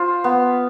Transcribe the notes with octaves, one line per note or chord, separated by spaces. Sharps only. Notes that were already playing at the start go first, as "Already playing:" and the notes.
Already playing: F4 C5
B3